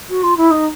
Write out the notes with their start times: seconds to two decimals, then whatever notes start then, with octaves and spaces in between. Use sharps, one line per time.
0.09 F#4
0.23 F4
0.37 E4
0.50 D#4